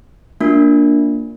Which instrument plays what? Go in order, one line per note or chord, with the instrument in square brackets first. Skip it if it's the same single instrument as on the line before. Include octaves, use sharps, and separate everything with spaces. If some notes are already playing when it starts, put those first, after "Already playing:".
[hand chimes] A#3 D4 F4